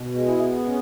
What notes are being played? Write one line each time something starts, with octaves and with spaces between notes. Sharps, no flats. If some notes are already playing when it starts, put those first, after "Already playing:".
Already playing: B2
G#3
E4 G#4
B3
C#4